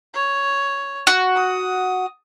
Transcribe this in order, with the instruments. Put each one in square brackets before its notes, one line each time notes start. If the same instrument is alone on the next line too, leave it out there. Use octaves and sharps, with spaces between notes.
[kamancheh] C#5
[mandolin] F#4
[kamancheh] D#6